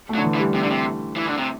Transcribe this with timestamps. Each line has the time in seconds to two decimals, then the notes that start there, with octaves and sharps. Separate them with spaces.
0.09 A3
0.15 F#3
0.18 D3
0.24 E3
0.35 E3
0.39 G3
0.54 C3
0.63 D3
0.70 C3
1.16 E3
1.26 D3
1.37 C3